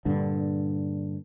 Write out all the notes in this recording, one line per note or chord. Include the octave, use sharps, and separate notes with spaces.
G2 A#2 D3